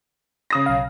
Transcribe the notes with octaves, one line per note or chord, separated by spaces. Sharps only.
C#3 D#6 A#6
B1 F5